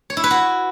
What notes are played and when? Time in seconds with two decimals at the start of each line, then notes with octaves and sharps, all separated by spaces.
0.10 C#5
0.17 E4
0.24 B4
0.31 F#4